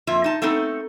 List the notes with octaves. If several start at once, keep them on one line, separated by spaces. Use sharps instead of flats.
F2 A#3 F4 E5
D#4 A5
A3 B3 C4 D#4 A4